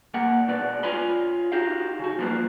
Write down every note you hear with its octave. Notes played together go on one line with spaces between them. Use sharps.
A#2 A#3 F#5
B2 G#3 B4 D5
F4 C#5 F5 G#5 B5 C6
D#4 F#4 G4 F5
C#3 F#4
F3 G3 A#3 F4 B4 C5